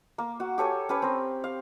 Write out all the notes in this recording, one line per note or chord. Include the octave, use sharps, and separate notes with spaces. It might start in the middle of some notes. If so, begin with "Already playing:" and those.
A#3
F#4 F#5
G4 A4 C#5 G#5
C#4 G4 B4 C#5
C4 A#4
F5